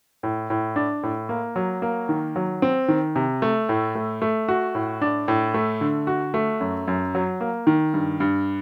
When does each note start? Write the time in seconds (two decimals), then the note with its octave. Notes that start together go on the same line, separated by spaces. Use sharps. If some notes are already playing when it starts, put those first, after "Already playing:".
0.23 A2
0.50 A2
0.76 D4
1.03 A2
1.29 A#3
1.56 F#3
1.82 A#3
2.09 D#3
2.36 F#3
2.62 C4
2.88 D#3
3.16 C3
3.42 A3
3.69 A2
3.95 A3
4.22 A3
4.49 F#4
4.75 A2
5.02 D4
5.28 A2
5.54 A3
5.81 D3
6.07 F#4
6.34 A3
6.61 F#2
6.88 F#2
7.15 F#3
7.41 A#3
7.67 D#3
7.94 G2
8.20 G2